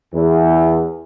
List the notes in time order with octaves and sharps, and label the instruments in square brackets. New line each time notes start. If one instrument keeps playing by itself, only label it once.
[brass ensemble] E2